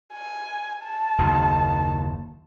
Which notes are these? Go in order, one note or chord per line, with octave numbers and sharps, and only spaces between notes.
G#5
A5
F#1 D#2 D#3